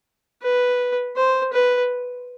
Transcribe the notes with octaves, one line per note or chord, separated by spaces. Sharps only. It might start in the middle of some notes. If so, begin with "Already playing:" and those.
B4
C5
B4